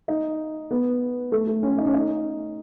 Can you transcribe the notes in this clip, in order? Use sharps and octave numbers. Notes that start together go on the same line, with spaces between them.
D#4
B3
A3
A3
C#4
D#4
C#4
D#4